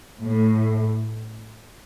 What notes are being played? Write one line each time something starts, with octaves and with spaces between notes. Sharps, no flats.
A2